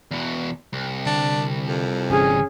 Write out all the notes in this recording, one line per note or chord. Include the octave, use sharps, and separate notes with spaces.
E2 B2
C2
D3 D4
F2
G1 E3 C#4 G#4